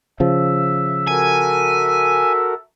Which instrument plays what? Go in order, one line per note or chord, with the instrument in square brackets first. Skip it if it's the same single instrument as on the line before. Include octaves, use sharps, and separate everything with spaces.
[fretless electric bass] C#3 F3 [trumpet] E5
[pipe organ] F#4 A4 A#4 [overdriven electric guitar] G#5